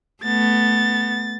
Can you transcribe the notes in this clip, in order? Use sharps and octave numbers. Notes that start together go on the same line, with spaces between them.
A3 B3 A6